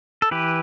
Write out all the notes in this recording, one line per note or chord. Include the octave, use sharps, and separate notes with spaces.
A4
E3 G4 B4